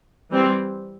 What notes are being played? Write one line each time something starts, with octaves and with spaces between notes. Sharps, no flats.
E3 G3 C4